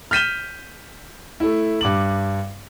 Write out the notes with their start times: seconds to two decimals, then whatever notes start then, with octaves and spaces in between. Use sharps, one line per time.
0.11 F6 G6 B6 D#7 E7 G7
1.40 A3 E4
1.81 G2 D6 F#7